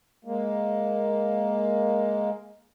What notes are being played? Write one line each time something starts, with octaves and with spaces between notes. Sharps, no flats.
G#3 A#3